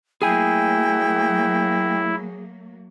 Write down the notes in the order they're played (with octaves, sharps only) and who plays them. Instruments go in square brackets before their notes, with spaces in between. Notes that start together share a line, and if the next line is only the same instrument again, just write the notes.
[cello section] F#3 A3 A#3 [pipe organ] E4 [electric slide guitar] G#4 G#5 [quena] G5